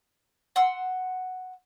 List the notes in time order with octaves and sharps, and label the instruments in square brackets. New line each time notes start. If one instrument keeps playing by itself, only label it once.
[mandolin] F#5 C6 E6